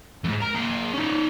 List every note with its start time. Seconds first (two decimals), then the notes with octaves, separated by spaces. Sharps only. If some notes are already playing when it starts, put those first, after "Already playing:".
0.24 F2 G#2
0.41 A#4 A#5
0.55 A#3 G#4
0.94 C#4 D#4